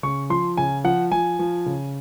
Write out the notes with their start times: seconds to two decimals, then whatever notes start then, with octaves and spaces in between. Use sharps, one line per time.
0.03 C#3 C#6
0.30 F3 C6
0.57 C#3 G#5
0.84 F3 F#5
1.11 F3 G#5
1.39 F3
1.66 C#3